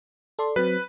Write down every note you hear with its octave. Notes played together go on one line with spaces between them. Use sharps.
A4 D5 C6
F#3 C4 B4